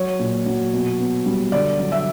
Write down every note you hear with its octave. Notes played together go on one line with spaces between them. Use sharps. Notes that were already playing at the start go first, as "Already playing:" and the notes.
Already playing: F#3 C#5
A#2
F#3
B2
B3
G3
D3 D5
F#3
E5